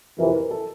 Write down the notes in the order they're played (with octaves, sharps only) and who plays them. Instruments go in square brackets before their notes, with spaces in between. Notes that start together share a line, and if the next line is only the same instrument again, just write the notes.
[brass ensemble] F2 C3 E3 [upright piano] A#4
[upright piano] B4
A#4
A4